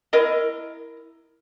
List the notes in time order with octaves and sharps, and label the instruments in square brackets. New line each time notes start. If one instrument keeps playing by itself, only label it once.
[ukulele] E4 A#4 D#5